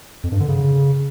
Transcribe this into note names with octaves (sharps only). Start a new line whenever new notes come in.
F2
G2
D3
C#3